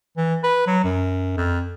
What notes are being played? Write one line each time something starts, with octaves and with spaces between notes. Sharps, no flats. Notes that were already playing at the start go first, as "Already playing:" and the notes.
E3
B4
F#3
F#2
F2